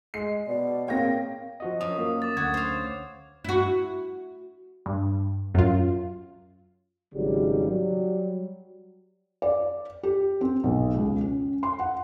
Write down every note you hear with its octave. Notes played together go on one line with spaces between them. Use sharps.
G#3 C7
B2 D5
A#3 C4 G#4 C#5 F5 G5 A#6
F3 F#4 D#5
F#2 D#6
A#3
D6 A6
D2 F#4 G#6
C5 F5
E4 F#4
G2
F#2 F4
G#1 C#3 F#3 G3
F#3 G3
D5
G4
C4
B1
C#2
C#4
C6
F#5